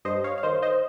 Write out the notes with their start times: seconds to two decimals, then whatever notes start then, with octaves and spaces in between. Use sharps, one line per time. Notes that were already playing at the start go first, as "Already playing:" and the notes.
0.05 G2 C5 D#5
0.24 C#5 F5
0.38 F5
0.43 D#3 C5 D#5
0.62 C5 D#5